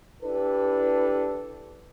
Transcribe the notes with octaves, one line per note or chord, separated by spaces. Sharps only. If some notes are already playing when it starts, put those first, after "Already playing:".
D4 E4 G4 A4 B4